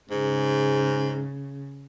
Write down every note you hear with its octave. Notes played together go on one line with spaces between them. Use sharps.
G#2 C#3